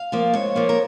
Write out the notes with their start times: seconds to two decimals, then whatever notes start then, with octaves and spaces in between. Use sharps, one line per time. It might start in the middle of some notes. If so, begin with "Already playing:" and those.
Already playing: F5
0.12 F3 A#3 F4
0.34 G#2 C#5
0.55 F3 A#3 F4
0.69 A#4